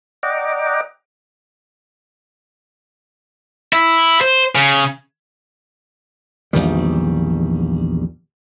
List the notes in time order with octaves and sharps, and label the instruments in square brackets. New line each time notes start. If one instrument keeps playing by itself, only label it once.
[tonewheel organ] D5 D#5 F#5 G5 A#5 D6
[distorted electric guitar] E4
C5
C#3
[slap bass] A#1 E2 D#3 G3